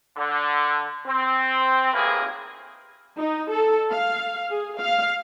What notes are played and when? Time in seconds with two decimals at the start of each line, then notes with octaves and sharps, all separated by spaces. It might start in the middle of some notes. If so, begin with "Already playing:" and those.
0.17 D3
1.07 C4
1.93 G#1 A2 C3 A#3 G#4 B4
3.18 D#4
3.51 A4
3.90 F5
4.50 G#4
4.80 F5